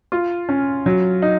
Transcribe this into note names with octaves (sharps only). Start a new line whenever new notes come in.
F4
C#4
F#3
D#4